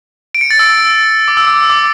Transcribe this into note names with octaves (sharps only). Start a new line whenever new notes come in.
D7
C#7
A6
E6
D6
E6
D6
D6